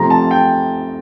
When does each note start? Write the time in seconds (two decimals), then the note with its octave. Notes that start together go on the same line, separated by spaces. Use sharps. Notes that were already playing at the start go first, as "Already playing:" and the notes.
Already playing: C3 F3 A3 A#5
0.10 A5
0.31 G5